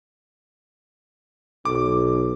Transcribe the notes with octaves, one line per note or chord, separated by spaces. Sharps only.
B1 D6